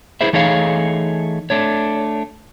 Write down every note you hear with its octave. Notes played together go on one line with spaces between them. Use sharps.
E4 G#4 B4 C5 E5
E3 A3 D#4 G#4 C#5 F5
A3 D4 C#5